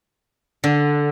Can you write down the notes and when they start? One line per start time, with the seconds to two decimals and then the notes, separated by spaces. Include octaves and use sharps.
0.64 D3